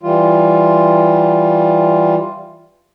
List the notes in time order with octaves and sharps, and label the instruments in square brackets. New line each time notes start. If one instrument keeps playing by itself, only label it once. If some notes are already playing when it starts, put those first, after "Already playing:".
[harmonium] E3 G3 F4